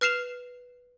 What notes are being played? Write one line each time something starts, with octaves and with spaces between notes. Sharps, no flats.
B4 F6 C7 E7 F7